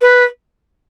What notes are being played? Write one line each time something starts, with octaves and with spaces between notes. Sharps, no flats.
B4